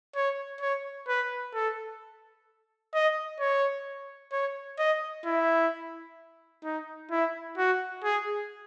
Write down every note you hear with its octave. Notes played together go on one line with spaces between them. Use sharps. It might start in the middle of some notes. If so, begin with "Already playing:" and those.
C#5
C#5
B4
A4
D#5
C#5
C#5
D#5
E4
D#4
E4
F#4
G#4